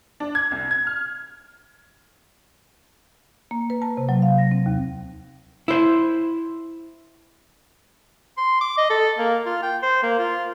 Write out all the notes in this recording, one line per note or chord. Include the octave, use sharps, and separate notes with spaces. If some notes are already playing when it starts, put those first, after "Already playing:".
D4
G#6
C2
G#6
F6
A#3
B4
A5
C3
F#3
F5
A#6
C4
D#2
E4 C5
C6
D6
D#5
A4
A#3
F4
G5
C5
A#3
F4